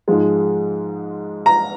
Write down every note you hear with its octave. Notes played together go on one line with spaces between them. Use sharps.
G#2 F3 G#3
A#5